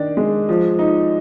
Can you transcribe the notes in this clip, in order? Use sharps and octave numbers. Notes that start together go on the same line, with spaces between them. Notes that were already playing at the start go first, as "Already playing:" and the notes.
Already playing: D#3 D4 D5
G#3
F3
D#4